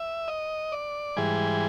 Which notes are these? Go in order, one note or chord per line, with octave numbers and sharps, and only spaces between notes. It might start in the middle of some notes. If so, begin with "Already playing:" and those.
Already playing: E5
D#5
D5
G#2 E3 G3 G#4